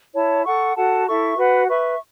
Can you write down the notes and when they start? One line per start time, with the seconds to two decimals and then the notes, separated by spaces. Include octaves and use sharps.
0.14 E4 C#5 A5
0.45 A4 F#5 C#6
0.75 F#4 A4 F#5 A5
1.07 E4 A4 E5 C#6
1.37 F#4 B4 F#5
1.68 B4 E5 C#6